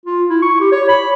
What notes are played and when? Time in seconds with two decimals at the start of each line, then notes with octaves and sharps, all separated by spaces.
0.06 F4
0.29 E4
0.42 C#6
0.60 G4
0.72 C#5
0.88 B5